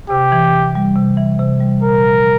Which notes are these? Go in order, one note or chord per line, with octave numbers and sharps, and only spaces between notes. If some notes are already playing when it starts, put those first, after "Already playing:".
C3 G4
E3
C3
G3
C3
E3
C3
G3
A#2 A#4
F3